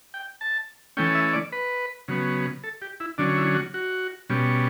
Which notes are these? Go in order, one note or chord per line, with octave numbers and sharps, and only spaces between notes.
G5
A5
E3 A3 C#4 G5
E5
D5
B4
C#3 F#3 B3
A4
G4
E4
D3 F#3 C#4 D4
E4
F#4
F#4
B2 G3 C#4